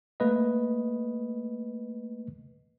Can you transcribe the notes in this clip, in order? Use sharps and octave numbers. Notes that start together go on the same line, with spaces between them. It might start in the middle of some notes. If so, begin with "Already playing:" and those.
A3 A#3 B4 D#5